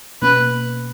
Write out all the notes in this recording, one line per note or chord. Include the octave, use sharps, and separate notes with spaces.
B2 A#3 C#4 B4